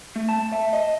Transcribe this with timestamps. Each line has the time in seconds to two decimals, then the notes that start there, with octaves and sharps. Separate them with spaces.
0.16 A3
0.29 A5
0.52 E5
0.73 D#5